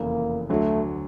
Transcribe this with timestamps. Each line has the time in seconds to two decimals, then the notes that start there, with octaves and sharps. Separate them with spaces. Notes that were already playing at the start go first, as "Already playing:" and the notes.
Already playing: F1 E2 C#3 A#3
0.49 D2 D3 F#3 A3